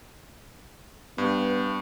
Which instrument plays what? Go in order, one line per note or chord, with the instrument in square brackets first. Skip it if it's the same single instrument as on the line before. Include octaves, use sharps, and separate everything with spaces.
[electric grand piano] G2 [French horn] B3